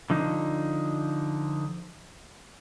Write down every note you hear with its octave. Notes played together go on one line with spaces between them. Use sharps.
D3 F3 D#4